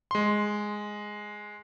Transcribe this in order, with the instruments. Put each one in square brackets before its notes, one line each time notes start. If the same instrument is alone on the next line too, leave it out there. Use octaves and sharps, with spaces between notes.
[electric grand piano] G#3 C6